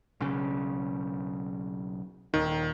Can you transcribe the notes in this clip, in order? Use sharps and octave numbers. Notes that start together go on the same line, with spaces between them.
B1 C#3
D#1 D#2 D#3